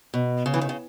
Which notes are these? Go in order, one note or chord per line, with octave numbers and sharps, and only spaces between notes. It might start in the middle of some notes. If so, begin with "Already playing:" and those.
B2
C#3
E3
D#3
C#3